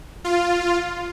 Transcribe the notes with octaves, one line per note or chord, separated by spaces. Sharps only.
F4